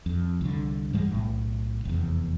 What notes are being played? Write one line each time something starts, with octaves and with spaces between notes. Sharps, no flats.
F2
C2 D3
G#2 E3 G3 G#3
B1 A2
F1 E2